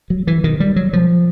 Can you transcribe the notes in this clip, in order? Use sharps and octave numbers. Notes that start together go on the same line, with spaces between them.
F#3
E3
B2 D#3
G3
F#3
B2 F3